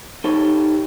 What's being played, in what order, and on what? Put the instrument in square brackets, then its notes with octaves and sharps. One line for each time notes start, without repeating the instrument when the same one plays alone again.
[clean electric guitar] D#4 G4 A4 C#5